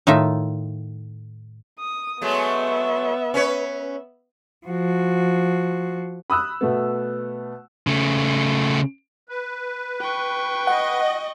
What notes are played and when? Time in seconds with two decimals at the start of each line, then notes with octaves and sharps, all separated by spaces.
0.07 A2 D#3 D#4 F4 E5
1.79 D#6
2.21 F#3 G#3 A3 B3 E5
3.34 C#4 B4 C#5
4.67 F3 F#4
6.30 B5 D#6 E6 F#6
6.61 B2 A3 B3
7.87 C#3 A3
9.29 B4
10.01 G5 C#6
10.67 D#5 F#5